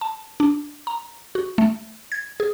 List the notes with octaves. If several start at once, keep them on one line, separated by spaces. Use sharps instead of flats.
A5
D4
A#5
F#4
A3
G#6
G#4